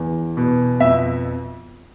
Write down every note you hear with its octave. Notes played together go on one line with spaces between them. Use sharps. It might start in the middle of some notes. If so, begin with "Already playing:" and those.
Already playing: E2
B2
F2 E5